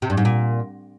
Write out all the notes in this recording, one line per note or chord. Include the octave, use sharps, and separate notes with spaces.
C3
G2
G#2
A#2